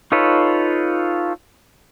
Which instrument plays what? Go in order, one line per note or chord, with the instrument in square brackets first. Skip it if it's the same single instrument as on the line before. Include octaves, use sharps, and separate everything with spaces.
[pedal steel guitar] D#4 F4 A4 B4 C#5